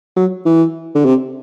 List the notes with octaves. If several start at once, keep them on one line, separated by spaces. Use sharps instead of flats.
F#3
E3
D3
C3